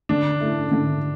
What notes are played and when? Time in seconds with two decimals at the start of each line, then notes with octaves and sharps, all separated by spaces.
0.09 D3 D4
0.40 A3 E4
0.71 D3